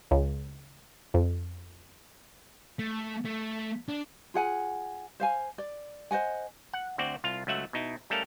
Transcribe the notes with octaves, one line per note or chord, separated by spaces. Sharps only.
C#2
F2
A3
A3
D4
F4 G#4 F#5 G#5
C5 F5 G#5
D5
C5 D#5 F#5 G#5
F#5
D2 C4 F#4 D5
C2 F4 F5
C#2 F#3 A3 E5 F#5
B2 D#4 E4
G3 A3 C#4 A4 A#4 F5